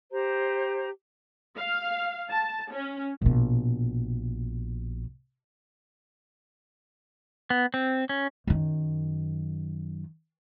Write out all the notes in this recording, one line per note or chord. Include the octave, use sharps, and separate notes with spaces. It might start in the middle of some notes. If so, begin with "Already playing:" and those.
G4 C5 A#5
F5
A5
C#4
A#1 B2
B3
C4
C#4
F#2 D#3